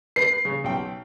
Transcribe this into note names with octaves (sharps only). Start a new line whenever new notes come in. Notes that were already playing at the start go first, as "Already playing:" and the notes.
B4 C7
C#3
B1 G5